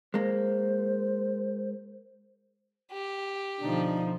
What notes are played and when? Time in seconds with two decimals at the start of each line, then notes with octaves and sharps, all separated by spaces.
0.14 G#3 A#3 C5
2.92 G4
3.60 B2 D3 F3 D4 D#4